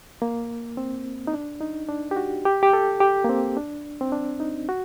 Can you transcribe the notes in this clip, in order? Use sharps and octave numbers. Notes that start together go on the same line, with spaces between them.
A#3
C4
D#4
D4
D#4
D4
G4
F#4
G4
G4
A4
G4
A#3
C4
D4
C4
D4
D#4
F#4